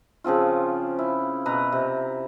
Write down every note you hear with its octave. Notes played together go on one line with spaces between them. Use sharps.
C#3 F3 C4 F4
E4
B2 B4 A#5
C3